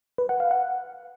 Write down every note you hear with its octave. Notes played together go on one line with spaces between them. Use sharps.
B4
F#5
F5
F#5